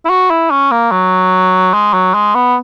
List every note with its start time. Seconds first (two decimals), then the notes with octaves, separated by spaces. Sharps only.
0.05 E4
0.10 F#4
0.30 E4
0.51 C#4
0.71 A#3
0.92 F#3
1.74 G#3
1.94 F#3
2.14 G#3
2.35 B3